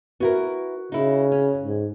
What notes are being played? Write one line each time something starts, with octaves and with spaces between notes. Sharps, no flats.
B3 E4 F#4 A#4
C#3 D#4 E4
C#4
G#2